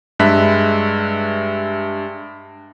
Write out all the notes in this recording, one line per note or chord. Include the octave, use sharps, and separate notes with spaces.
G2 G#3 E5 F#6 B6